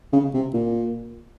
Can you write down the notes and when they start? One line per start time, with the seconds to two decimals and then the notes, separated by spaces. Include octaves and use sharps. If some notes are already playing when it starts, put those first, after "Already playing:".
0.13 C#3
0.34 C3
0.54 A#2